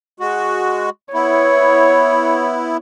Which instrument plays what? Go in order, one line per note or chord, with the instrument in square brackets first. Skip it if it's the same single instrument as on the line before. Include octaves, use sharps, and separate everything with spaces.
[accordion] G#3 F#4
[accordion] B3 E4 [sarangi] C#5